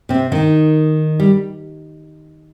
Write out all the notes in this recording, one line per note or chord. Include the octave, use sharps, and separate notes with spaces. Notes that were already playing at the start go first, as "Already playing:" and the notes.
C3 C4
D#3 D#4
G3